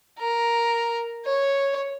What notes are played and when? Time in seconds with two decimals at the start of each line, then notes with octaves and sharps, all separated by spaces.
0.19 A#4
1.25 C#5